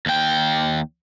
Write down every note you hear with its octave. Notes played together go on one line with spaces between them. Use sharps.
D#2 G5